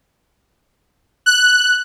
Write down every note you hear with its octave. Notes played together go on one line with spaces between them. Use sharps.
F#6